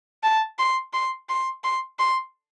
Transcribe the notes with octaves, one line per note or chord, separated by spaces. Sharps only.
A5
C6
C6
C6
C6
C6